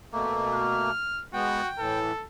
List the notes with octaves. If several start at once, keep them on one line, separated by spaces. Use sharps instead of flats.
B2 A3 A#3
F6
G#3 B3 F#4 G5
A2 E3 A4